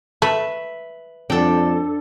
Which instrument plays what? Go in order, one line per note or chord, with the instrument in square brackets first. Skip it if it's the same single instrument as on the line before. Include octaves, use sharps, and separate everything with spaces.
[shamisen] A3 [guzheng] B4 E5 B5
[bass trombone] F2 [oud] D4 [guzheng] A4 G5